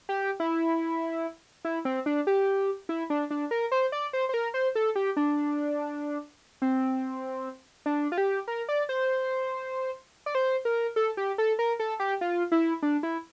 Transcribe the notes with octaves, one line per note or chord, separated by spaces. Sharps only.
G4
E4
E4
C4
D4
G4
E4
D4
D4
A#4
C5
D5
C5
C5
A#4
C5
A4
G4
D4
C4
D4
F4
G4
A#4
D5
C5
D5
C5
A#4
A4
G4
A4
A#4
A4
G4
F4
E4
D4
E4